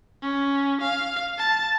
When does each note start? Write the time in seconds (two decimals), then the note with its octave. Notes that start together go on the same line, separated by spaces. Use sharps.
0.22 C#4
0.81 F5
1.38 A5